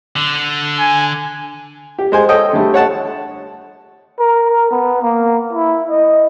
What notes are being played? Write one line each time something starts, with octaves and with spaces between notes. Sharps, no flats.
D3
G#5
G4
G#3 C5 G#5
A4 C#5 D#5 G5
D3 G3 A3
C#5 F#5 A5
A#4
B3
A#3
E4
D#5